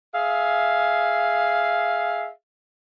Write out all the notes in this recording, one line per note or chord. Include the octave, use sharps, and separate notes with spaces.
G#4 E5 F5